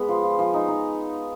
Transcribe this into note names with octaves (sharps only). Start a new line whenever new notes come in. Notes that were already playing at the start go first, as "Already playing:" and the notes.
Already playing: G#3 B3
F3
F3
F3
D#4
D#4